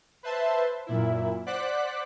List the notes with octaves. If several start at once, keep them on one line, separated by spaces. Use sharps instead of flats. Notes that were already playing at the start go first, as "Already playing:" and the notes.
B4 C5 E5 A5 C6
F#2 A#2 E4
C5 D5 F#5 D6 F#6 B6